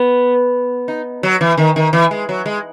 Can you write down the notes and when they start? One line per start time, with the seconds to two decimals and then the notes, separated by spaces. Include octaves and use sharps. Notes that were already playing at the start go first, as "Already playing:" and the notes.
Already playing: B3
0.88 D#4
1.23 F#3
1.41 E3
1.58 D#3
1.76 D#3
1.93 E3
2.11 G#3
2.29 F#3
2.46 G#3